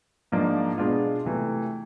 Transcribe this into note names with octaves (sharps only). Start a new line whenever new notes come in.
G#2 F3 A#3 D4
B2 G#3 B3 D4 F4
C3 E3 A3